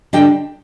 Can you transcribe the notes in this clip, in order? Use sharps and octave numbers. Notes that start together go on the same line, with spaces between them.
D3 G3 D4 D#5 G5